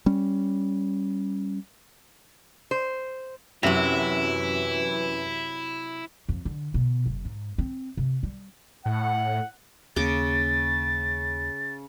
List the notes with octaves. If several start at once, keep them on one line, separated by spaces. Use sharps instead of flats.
G3 C#4
C5
F#2 C3 E3 F#3 E4 E5 F7
F2
D3
B2
F#1
G#2
C4
C3
G3
A2 F#5
D#2 C#3 A#3 D6 A6